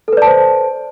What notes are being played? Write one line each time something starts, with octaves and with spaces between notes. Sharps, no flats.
A4 B4 C5 D5 A5